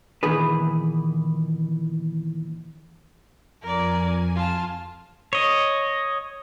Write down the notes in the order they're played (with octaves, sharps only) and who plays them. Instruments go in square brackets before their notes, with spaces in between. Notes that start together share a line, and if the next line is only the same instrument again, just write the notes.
[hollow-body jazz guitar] A#2 D#3 E3 B3 G#4 B4
[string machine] F2 G#5 [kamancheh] A#4 D5
[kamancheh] F4 A5
[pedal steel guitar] C#5 D#5